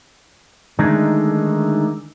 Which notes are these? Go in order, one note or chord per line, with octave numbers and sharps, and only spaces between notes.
D3 D#3 G#3 A3 D#4